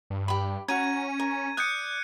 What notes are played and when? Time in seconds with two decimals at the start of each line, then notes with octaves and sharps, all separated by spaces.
0.10 G2
0.28 G4 B5
0.68 C#4 F#4 A#5 G#6 D#7
1.20 A#4
1.57 D5 D#6 F#6 G6 C#7